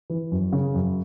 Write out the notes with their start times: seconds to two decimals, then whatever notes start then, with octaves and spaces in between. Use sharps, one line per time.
0.10 E3
0.32 F#2
0.52 C#3
0.75 F#2